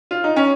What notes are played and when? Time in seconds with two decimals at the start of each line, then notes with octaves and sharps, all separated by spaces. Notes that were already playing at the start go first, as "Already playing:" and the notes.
0.11 F4
0.24 D#4
0.36 C#4